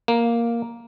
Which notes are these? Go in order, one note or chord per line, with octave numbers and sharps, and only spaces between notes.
A#3